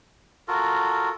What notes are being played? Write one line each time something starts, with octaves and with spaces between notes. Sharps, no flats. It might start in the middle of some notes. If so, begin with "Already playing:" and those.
F4 F#4 A4 A#4